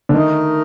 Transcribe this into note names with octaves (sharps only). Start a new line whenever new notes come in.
D3
D#3 A3 D#4 A#4 D#5